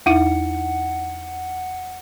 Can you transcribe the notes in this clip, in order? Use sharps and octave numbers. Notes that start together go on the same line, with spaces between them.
E2 D#4 E4 F#5